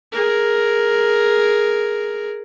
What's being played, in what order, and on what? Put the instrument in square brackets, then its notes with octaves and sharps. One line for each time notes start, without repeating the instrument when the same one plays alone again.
[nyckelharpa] G#4 A#4